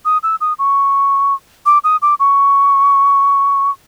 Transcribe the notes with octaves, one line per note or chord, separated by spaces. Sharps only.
D#6
E6
D#6
C#6
D6
D#6
D6
C#6